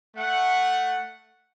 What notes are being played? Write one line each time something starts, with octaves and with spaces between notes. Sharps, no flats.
A3 F#5